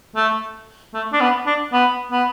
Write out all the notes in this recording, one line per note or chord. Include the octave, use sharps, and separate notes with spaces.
A3
A3
D4
B3
D4
B3
B3